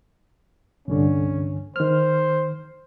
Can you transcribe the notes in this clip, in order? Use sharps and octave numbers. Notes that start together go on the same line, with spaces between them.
C2 G2 D3 C#4
D#3 C5 F6